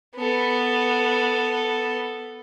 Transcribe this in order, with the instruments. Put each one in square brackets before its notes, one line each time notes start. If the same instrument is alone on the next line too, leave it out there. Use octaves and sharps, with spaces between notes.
[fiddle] B3 A4